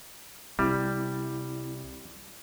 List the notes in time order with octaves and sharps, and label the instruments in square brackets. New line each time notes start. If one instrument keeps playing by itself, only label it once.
[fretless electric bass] C2 [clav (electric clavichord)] G3 [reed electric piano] C4 E4